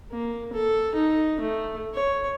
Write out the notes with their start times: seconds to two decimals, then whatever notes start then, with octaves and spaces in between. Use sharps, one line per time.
0.12 A#3
0.53 A4
0.95 D#4
1.40 A3
1.94 C#5